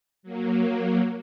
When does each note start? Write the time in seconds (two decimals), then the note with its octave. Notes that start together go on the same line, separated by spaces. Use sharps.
0.23 F#3 A#3